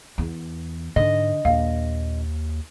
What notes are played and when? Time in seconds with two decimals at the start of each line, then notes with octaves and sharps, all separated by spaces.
0.18 E2
0.96 G#2 D3 D#5
1.45 A#1 D#2 F5